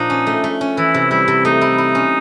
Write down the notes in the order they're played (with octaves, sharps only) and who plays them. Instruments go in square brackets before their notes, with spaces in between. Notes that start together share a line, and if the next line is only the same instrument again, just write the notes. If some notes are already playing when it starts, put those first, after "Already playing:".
Already playing: [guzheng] A#2 F3 A#3 D4 [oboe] D#4
[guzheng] C#4
A3
A3
C#4
[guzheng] E3 [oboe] E4
[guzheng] C3
[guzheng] G3 [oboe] E4
[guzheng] C3
[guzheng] A3 [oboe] D#4
[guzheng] E4
E4
C#4